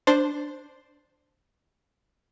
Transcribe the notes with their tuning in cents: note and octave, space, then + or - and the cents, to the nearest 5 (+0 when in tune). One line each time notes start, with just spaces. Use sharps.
D4 +0 C5 +0 A5 +0